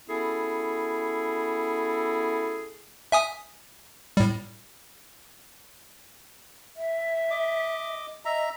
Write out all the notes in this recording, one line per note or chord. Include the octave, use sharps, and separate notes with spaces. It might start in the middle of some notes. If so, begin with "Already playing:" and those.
B3 C#4 E4 F#4 G#4 A4
E5 G#5 D#6
A2 G3
E5
D#5 D6
D#5 E5 A#5